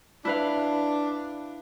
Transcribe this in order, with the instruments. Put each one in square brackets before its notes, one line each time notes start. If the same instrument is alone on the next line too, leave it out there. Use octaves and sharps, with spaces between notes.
[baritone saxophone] D4 [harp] E4 B4 F5